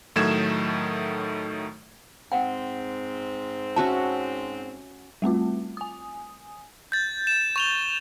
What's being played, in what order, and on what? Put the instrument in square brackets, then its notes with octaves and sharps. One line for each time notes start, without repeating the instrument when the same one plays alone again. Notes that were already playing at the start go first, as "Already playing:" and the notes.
[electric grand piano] A2 D#3 F#3 A3 G#6 E7
[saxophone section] G#2 C4 [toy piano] F#5 G5
[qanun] C#4 F#4 E5 [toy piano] A5
[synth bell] G3 A3 C4 F4
G#5 D#6
[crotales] G6 A6
E7
C#6 F7 G7